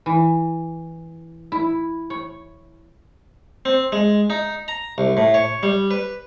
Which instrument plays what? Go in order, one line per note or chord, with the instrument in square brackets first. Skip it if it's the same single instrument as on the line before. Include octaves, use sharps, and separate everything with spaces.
[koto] E3
E4
C#5
[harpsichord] C4
G#3
D#4
A#5
C2
A2
C#5
G3
B4